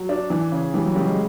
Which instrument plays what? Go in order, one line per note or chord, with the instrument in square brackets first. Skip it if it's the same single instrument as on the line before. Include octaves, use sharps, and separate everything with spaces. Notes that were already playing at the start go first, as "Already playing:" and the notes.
Already playing: [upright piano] F#3
D4
E3
C#3
[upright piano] E3 [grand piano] G3
[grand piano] F#3
[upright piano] C#3 [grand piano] G3
[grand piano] G#3